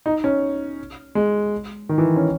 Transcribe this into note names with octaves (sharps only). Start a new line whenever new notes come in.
D#4
C#4
G#3
D#3
E3
C#4